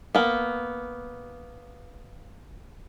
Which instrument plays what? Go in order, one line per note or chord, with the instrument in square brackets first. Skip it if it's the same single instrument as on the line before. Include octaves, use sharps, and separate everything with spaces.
[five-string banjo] A#3 B3